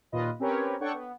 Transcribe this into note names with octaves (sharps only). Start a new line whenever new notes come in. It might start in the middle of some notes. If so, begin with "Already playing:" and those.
D#2 A#2 F4 B4 D#5
C4 C#4 G4 A#4 B4 C#5
D4 A4 C#5 F#5 G5 C#6
B3